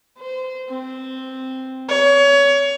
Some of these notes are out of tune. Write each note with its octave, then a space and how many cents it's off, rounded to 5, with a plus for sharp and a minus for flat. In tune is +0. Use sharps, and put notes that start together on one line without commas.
C5 -25
C4 +0
C#5 +25